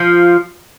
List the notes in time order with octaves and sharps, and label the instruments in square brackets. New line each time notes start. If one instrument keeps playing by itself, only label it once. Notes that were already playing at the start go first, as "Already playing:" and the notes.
Already playing: [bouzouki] F3